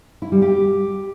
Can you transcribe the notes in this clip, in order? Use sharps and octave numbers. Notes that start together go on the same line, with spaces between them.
E4
G3
G4